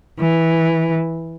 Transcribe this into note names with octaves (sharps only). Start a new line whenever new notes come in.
E3